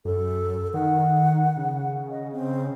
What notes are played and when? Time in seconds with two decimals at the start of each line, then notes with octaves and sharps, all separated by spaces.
0.05 F#2 A4
0.74 D#3 F#5
1.57 C#3
2.10 D#5
2.32 C4